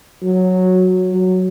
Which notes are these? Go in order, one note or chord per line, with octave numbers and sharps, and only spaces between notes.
F#3
F#3